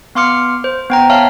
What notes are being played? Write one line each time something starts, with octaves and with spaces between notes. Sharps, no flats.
B3 F5 C6 D6 F6 C#7
C5
B3 G5 A#5
C#5 E5 F5 A5 F6